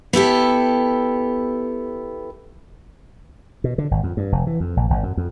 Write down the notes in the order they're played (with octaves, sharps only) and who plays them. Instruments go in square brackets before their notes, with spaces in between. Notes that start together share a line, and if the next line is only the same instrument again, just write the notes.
[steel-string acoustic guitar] B3 E4 G4 A4
[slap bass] B2
D3
G#1
F2
G2
F1
E3
F2
A#1
G#1
F#2
F2